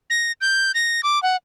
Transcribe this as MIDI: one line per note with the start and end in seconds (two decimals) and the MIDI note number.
0.10 0.32 94
0.41 0.72 91
0.75 1.01 94
1.03 1.21 86
1.23 1.36 78